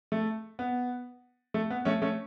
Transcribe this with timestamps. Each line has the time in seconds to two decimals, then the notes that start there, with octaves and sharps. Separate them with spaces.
0.12 A3
0.59 B3
1.54 A3
1.70 B3
1.85 A3 C#4
2.02 A3 C#4